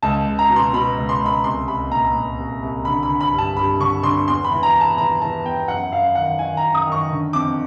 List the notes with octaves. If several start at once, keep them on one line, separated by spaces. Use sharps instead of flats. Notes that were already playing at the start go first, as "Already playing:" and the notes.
C#2 A5
C#2
A#5
B2
C6
B2 B5
C#2
C6
C#2
B5
C2 C6
C2 B5
A#2 A#5
A#2
C2
C2
D3 B5
B5
D3
B5
G2
A5
G2 B5
D3 C#6
D3 C6
E2 C6
B5
E3
A#5
E2
A5
E3 A#5
E3 A5
E2 G5
F#2 F#5
F#2 F5
D#3 F#5
D#3 G#5
A#5
F#2
D#6
D#3
C#6
D3
F2 D6